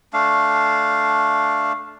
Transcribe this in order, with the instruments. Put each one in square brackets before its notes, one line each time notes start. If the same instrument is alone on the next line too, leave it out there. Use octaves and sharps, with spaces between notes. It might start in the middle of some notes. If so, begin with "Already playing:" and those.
[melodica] A3 D4 F5